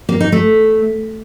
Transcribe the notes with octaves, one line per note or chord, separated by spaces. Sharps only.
A#3
D#4
A3